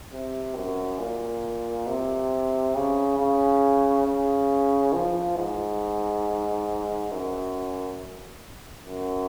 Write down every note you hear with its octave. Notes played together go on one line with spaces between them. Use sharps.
C3
F#2
A#2
C3
C#3
C#3
C#3
F3
G#2
F#2
F#2